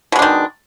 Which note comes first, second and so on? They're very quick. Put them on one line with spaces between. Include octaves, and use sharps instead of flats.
B2 G#3 D4 D#3